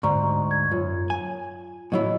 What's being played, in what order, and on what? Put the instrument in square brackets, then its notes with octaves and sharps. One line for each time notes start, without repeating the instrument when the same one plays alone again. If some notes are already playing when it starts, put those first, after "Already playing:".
[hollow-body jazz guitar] D2 G#2 [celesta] D5 A#5 C#6
[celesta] G#6
[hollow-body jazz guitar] F#2 [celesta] F4
[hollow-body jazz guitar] G#5
[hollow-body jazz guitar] A2 F#3 E4 [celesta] D#5